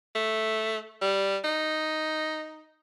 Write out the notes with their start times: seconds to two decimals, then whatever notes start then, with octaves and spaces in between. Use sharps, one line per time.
0.15 A3
1.01 G3
1.44 D#4